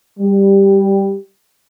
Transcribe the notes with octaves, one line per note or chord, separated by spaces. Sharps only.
G3